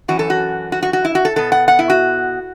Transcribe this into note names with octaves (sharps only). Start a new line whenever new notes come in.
F#2 E3 C#4 F#4
A4
F#4
F#4
F#4
F#4
E4
F#4
A4
B2 B3 A4
F#5
F#5
E4
F#4